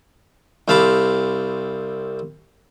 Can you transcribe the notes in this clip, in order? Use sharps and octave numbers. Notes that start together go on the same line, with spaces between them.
C2 C4 F5 A5 B5 D6